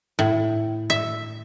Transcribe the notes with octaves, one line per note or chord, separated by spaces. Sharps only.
A2
E5